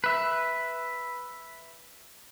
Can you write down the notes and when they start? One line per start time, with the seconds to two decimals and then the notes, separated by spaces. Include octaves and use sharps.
0.04 B4 E5